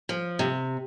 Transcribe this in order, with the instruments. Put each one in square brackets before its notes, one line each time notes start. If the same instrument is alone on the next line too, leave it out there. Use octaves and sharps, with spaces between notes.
[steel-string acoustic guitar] F3
C3